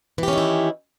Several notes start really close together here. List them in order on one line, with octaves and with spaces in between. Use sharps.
E3 G4 C#4 D#3 E4